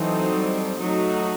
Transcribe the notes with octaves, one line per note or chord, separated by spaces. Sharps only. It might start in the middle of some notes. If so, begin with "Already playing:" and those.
Already playing: E3 F#3 C4 D#4 A4 C5
G3
F#3 A3 D#4 F#4